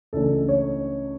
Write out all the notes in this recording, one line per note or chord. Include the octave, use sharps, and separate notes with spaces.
C#2 C#3 E3 A3 D4 A4
C#5